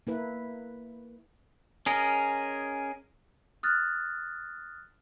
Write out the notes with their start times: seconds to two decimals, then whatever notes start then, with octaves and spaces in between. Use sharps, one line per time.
0.07 A#3 E4 B4
1.86 C#4 G#4 A#4 D#5
3.63 D#6 F6 F#6 A6